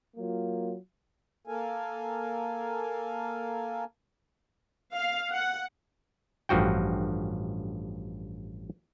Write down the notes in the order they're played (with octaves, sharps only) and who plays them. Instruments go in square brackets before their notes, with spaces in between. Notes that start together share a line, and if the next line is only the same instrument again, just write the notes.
[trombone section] F#3 A#3 F4
[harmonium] A#3 A4 A#4 F5 G#5
[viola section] F5
F#5
[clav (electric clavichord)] A1 G2 F3 F#4 G5